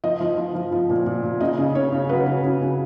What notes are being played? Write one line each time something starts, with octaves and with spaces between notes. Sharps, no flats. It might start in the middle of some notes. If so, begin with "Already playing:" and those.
F3 D#5
F3
F3
F3
F3
A#2
A#2
A#2
C#3 D#5
C#3
C#3 C#5
C#3
F#3 B4
C#3
C#3
C#3